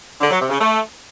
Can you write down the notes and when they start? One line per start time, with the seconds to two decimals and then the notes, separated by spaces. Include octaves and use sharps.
0.20 D3
0.30 F#3
0.39 C3
0.49 C#3
0.59 A3